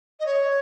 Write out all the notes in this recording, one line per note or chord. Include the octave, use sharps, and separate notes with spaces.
D#5
C#5